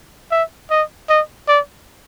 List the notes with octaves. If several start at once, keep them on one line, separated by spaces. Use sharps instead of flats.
E5
D#5
D#5
D5